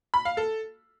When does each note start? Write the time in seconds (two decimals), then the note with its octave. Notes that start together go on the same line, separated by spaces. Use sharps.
0.14 B5
0.25 F5
0.37 A4